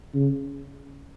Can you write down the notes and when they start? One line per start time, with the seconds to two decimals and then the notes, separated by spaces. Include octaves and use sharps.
0.15 C#3